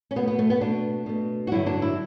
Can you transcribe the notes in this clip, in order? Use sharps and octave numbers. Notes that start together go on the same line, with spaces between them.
C#4
B2 A3 B3
B3
A3
B3
B2 A3 D4
B2 A3
F#4
G2 D3 F#3 E4
D4
E4